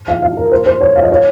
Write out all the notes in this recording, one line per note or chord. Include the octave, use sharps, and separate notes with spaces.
F5
F5
A#4
C5
C5
C#5
F5
D#5
C#5